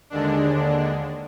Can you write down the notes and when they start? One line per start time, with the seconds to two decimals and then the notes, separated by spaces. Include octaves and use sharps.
0.10 D#2 D3 G#3 D4